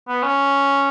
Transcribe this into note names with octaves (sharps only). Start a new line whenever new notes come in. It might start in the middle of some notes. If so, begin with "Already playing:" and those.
B3
C#4